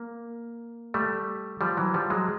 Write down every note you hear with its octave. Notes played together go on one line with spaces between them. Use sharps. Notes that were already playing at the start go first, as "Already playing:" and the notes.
Already playing: A#3
G3 A3
F3 G3
E3 F#3
F3 G3
F#3 G#3